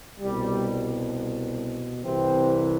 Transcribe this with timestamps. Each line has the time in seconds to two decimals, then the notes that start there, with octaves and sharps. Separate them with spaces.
0.20 C2 B2 G3
2.04 C2 C3 E3 C4